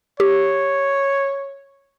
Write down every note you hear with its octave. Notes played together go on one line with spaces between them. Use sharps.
G4 C#5